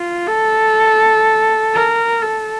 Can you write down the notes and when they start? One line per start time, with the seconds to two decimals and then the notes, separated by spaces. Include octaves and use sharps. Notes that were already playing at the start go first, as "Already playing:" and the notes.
Already playing: F4
0.27 A4
1.74 A#4
2.22 A4